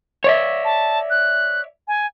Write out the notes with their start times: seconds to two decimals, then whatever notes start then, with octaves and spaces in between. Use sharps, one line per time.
0.24 C#5 D5 E5
0.65 A5
1.10 F#6
1.88 G#5